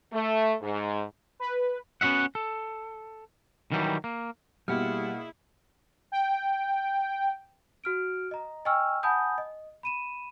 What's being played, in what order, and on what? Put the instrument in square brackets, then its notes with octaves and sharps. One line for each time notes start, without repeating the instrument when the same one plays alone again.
[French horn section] A3
G#2
[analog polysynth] B4
[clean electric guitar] B3 C#4 F#4 E5 F#5
A4
D#3 E3 F#3 G3
A#3
[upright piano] B2 [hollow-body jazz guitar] G3 [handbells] A#3 F#5 F6 [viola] E4 G#4
[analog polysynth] G5
[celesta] F#4 F6 D7
D#5 A#5
D#5 G5 G#5 C#6 E6 F6
F#5 G#5 A5 B5 D#6 G6
D#5
B5 D#7 E7